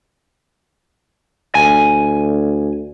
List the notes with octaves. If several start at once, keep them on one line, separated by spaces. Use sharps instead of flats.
D2 G#5